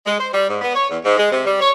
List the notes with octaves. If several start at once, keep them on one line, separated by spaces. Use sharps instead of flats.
G#3
C5
G3
G#2
B3
C#5
E2
G#2
G#3
C3
G3
C#5